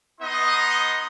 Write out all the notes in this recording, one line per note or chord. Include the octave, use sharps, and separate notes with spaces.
B3 D#4 D#5 C6